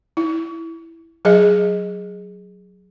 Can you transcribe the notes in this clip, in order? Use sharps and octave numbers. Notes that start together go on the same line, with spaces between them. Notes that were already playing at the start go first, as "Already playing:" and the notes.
E4
F#3 G#4 D#5